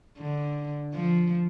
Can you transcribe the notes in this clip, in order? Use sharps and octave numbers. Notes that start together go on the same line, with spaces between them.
D3
F3